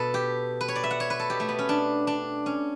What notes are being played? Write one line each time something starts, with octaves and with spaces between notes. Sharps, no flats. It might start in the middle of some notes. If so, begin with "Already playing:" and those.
Already playing: B2 A4 B4
G4
B4
C#5
D5
E5
F#5
C#5
B4
A4
B2 G4
A3
B3
C#4
D4
D4
C#4